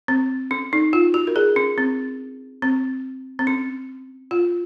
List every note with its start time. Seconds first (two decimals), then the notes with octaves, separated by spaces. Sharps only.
0.08 C4
0.51 C#4
0.73 D#4
0.93 F4
1.14 F#4
1.27 A#4
1.36 G#4
1.56 C#4
1.78 C4
2.62 C4
3.39 C4
3.47 C#4
4.31 F4